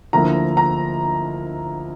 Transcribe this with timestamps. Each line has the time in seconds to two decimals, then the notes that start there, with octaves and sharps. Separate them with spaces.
0.13 D2 D3 F3 A#3 E4 A#5
0.57 A#5